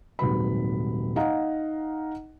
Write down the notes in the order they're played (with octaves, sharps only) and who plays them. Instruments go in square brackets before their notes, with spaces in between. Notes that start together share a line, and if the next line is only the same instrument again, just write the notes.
[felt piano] D#1 G#2 C3 F#3 B4 B5
D#4 D#5 F5 F#5 A#5